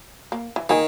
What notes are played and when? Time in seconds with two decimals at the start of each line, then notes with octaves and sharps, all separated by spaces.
0.32 A#3
0.56 E3
0.69 D#3 A#3 G#4